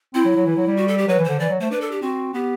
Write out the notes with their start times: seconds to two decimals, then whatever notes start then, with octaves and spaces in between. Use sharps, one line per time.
0.14 C4 E4
0.25 F#3
0.35 F#3
0.46 E3
0.57 F#3
0.67 G3
0.77 F#4
0.88 A4
0.98 G4
1.08 F#3 B4
1.19 E3
1.24 C5
1.29 D3
1.39 E3 D5
1.50 F#3
1.61 A3 C5
1.71 D4 B4
1.81 A4
1.91 G4
2.02 C4 F#4
2.34 B3 G4